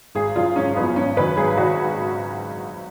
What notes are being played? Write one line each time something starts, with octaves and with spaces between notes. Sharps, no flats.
G#1 G#4
F#2 F3 F4
G#1 C#4
F#2 F3 B3
G#1 C#4
F#2 D#3 F#3 B4
G#1 G#4
D#3 F#3 F#4